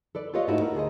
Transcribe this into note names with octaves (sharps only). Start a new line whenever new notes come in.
A4 B4 D5
F4 G4 B4 C#5 D#5 F5
G#2 A3 A#3 D#4 E4 F#4
A#4
D2 G#4 C5 D#5